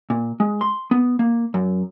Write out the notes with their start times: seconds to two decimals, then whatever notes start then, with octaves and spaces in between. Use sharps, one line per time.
0.10 A#2
0.40 G#3
0.61 C6
0.91 B3
1.19 A#3
1.54 F#2